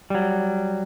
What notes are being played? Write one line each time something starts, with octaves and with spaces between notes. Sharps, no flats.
F#3 G3